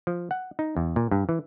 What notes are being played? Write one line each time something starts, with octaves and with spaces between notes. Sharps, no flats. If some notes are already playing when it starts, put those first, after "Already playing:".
F3
F#5
D#4
E2
A#2
G2
E3